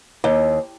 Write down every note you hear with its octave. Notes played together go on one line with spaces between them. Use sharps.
D#2